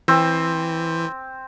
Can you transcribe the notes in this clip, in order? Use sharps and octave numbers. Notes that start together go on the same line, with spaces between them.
E3 C4